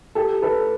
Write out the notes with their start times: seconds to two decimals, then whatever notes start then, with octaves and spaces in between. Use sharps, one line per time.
0.15 G4 A4
0.42 A4 B4